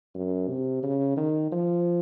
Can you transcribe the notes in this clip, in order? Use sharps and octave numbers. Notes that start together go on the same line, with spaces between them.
F#2
C3
C#3
D#3
F3